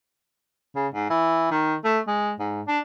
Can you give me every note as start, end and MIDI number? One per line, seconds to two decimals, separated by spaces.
0.75 0.87 49
0.94 1.07 44
1.10 1.47 52
1.51 1.76 51
1.84 1.99 57
2.07 2.32 56
2.39 2.62 44
2.67 2.80 62